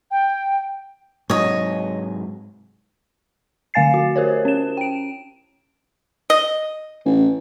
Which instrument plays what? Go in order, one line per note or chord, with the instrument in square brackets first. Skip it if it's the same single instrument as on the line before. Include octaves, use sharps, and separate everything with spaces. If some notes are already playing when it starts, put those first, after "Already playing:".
[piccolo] G5
[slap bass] G#2 C3 F#3 [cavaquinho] C#5 D#5
[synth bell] D3 A3 F5 G#5 A6 C7
F#4
G4 A#4 C5 C#5
C#4 E7
G5 D7
[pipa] D#5
[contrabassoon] A1